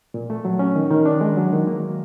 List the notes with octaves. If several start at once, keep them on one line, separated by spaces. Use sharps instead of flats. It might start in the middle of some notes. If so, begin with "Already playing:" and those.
A#2
A3
F#3
C#4
D#3
D#3
D4
G#3
F#3
D#3
A#3